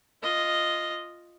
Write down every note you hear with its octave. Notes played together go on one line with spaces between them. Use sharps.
F4 D#5